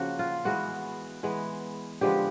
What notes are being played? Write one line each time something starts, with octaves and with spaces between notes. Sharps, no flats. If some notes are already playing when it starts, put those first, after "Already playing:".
Already playing: C#3 F3 A#3 F#4
F4
E3 G#3 B3 F#4
E3 G#3 B3
D3 F3 G#3 B3 G4